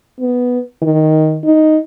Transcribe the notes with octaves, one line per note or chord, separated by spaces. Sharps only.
B3
D#3
D#4